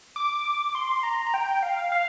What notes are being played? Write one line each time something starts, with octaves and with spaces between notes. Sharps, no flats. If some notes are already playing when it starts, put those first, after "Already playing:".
D6
D6
C6
A#5
A#5
G5
F5
F5